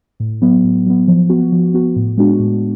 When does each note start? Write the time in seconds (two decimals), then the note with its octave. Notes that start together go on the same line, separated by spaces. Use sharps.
0.20 A2
0.41 F#3 B3
0.64 A2
0.86 F#3 B3
1.08 F3
1.30 B3 F#4
1.52 F3
1.74 B3 F#4
1.96 A2
2.17 G#3 B3 D4 F#4
2.39 A2